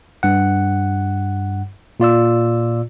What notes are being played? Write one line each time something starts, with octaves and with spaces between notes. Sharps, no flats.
G2 F#5
A#2 F4 D5 E6